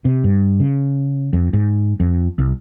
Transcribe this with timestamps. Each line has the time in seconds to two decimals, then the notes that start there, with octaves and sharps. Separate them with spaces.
0.05 C3
0.24 G2
0.60 C#3
1.33 F2
1.53 G#2
2.00 F2
2.38 C2